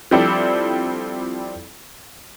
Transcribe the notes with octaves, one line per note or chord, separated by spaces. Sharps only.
F3 G3 C4 D4 E4 A4